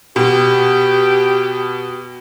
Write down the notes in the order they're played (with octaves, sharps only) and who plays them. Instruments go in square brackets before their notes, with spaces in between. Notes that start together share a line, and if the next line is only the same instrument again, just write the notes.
[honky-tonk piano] B2 [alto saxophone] G4